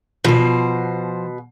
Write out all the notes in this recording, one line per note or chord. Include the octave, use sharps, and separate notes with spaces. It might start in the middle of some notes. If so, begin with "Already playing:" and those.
B2 F3 C5